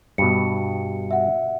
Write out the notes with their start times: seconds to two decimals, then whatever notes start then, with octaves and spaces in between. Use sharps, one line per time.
0.18 G2 B2 C#7
1.11 E5 F#5